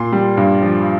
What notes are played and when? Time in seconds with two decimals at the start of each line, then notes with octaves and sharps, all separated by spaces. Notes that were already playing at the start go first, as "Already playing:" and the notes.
Already playing: A#2 C6
0.12 G3
0.37 G2
0.62 F3